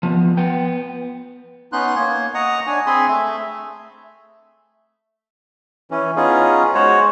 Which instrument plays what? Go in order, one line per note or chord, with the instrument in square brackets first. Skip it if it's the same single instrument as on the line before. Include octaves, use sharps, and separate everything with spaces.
[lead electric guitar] F3 B3
B3 G5
[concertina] B3 C#4 D#4 C6 F#6
A#3 C#5
D#5 F#5 A#5 C#6 D#6
D4 C#5 G#5
C4 G#4 G#5 B5 C6
A3 E5
[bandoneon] E3 C#4
B3 C#4 D#4 F4 G#4
G#3 F#4 C5 C#5